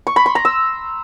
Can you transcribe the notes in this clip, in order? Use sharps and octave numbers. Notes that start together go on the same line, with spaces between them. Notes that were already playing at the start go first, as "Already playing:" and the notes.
C#6
B5
C6
A#5
E6